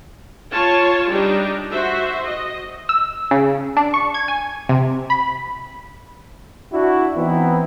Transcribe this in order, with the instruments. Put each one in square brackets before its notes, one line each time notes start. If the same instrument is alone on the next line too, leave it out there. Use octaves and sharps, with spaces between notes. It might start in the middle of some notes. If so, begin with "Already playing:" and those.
[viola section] F4 C#5 A5
G3 D4 D#4 G4
F#4 C5 E5
D#5
[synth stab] E6
C#3
D4
C#6
G#6
G#5
C3
B5
[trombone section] D4 E4 F#4
E3 B3 C4 D#4 E4